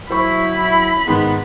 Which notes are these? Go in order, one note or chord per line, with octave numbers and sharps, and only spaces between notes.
F#3 E4 C5 B5 C#6
G#2 D#3 B3